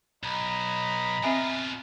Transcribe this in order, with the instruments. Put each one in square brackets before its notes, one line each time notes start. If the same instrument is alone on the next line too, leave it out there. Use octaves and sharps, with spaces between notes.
[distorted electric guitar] B1 [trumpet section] D#5 A#5 B5
[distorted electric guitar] B2 F4 [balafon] C4 E5 G#5